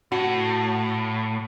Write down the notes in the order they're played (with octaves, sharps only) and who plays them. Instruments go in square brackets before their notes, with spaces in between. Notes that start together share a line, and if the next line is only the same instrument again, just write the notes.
[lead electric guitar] A2 [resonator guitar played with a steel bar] F#4